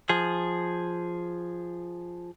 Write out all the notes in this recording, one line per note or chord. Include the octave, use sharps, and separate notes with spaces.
F3 G#4